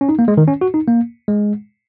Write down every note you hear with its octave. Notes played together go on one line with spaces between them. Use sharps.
C#4
D#4
A#3
G#3
D#3
C#4
F#4
D#4
A#3
G#3